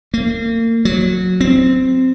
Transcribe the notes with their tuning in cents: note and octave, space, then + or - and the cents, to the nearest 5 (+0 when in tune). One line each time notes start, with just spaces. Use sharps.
A#3 -35
F#3 -20
C4 -10